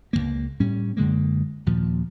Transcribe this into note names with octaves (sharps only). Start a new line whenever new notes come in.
C#2 F#2 A#3
A2 G3 C#4
F#2 D3 G#3 A#3
D#2 A#2 F3